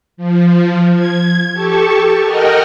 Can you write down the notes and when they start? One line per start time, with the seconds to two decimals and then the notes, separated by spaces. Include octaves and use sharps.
0.17 F3
0.95 G#6
1.53 G4 A4 A5 C#6
2.21 A#4 D#5 F#5 G5 F6